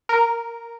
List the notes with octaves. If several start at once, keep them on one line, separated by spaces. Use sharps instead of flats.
A#4